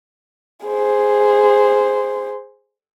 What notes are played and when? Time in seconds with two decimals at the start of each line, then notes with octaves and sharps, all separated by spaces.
0.67 G#4 C5